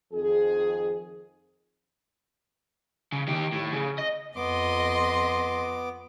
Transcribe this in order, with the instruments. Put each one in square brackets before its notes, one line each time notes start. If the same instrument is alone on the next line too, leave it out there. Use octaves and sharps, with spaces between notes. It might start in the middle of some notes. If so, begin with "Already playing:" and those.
[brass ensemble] F2 D#3 G#4
[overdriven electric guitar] C#3
D#3 G4
A2
C#3
D#5
[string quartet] F2 D#5 C6 [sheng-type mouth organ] B3 D6